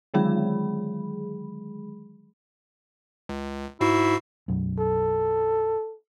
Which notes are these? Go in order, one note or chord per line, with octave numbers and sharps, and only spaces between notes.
D3 D#3 F#3 G#3 G#4 B5
C#2
G#2 E4 F#4 C7
B1 F#2
A4